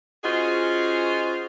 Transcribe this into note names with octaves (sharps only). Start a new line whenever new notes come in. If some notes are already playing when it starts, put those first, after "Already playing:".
C#4 F4 F#4 G#4 C5 D#5